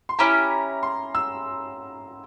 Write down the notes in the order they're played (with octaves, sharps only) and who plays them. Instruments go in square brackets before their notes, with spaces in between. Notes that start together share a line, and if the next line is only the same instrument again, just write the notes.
[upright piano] C6
[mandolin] C#4 E4 G4 [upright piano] A#5
[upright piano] C6
E6